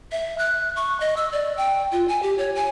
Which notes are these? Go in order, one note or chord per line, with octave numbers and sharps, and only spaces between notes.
E5
F#6
C#6
D#5
E6
D5
G5
F4
G#5
G4
C#5
G#5